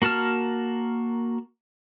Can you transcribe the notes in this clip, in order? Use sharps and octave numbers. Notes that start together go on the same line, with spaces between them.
A#3 F#4 A#4 A5 F6